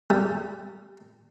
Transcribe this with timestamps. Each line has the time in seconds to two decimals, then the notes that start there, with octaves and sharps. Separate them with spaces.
0.10 G3